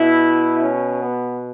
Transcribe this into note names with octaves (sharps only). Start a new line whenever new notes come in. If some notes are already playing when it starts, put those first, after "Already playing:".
Already playing: B2 E4
C#4
B3